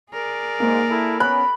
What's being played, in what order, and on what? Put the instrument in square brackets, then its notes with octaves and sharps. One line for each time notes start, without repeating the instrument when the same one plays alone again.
[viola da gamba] G#4 A#4 D5
[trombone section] G#2 [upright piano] A#3
[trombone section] E4 A4
[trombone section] B3 C#4 [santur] B5 [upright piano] F#6